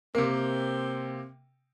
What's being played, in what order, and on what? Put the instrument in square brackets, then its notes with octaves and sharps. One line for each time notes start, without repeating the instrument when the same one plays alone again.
[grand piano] C3 A#3 [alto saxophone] C4 [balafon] A#4